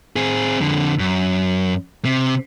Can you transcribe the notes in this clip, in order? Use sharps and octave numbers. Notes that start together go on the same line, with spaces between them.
C4 G#4
F2 D3
F#2
C3